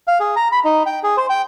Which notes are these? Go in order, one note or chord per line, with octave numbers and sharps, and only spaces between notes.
F5
G#4
A#5
B5
D#4
G5
G#4
C5
G5